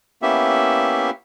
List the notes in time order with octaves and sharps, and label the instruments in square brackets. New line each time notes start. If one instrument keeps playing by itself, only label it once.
[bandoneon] A#3 B3 C#4 E4 G4 E5